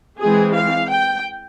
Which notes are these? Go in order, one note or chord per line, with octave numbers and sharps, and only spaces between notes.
E3 G#3 C4 G#4
F5
G5